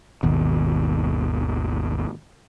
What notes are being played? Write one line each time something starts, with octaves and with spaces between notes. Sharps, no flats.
G#1 D#2 B2